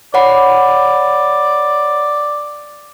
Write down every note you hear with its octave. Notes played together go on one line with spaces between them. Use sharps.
C#5 D5 F#5 B5